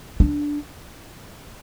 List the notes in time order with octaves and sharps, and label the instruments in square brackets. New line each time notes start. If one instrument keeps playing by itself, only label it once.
[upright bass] D4